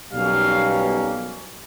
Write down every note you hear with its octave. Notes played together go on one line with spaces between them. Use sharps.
B1 B2 G3 A#3 C#4 F5